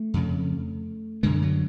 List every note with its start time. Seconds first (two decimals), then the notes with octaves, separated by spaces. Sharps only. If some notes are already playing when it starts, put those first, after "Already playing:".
Already playing: A3
0.14 F2 C#3
1.23 F#2 D3 G#3
1.42 F#3